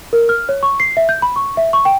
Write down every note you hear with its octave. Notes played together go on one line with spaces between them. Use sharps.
A#4
F6
C#5
C#6
C7
E5
G6
B5
C#6
E5
C#6
G5